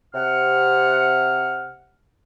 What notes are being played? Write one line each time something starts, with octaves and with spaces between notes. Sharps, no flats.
C3 F#5 F6